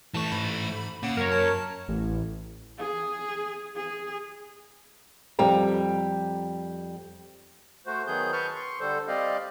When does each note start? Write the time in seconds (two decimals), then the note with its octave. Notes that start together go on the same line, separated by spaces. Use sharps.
0.14 E3 A3 A5 C#6
0.32 G#2 B5
1.03 C#3 A#3 F#5
1.17 F#2 A#4 C#5
1.32 A5
1.88 A1
2.78 G#4
3.76 G#4
5.39 F2 G3 G5 A#5
7.86 A3 F#4 C5
8.07 D#3 F#3 B3 G#4 G6
8.33 B4 A5 C#6 F6 G6
8.55 C6 C#6
8.80 D3 G3 A4 C5
9.08 G3 C4 G4 D5 D#5 F5